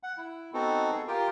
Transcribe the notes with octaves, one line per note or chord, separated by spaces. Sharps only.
F#5
E4
B3 C4 D#4 F#4 A4
G#4
F4 G4 A#4 G5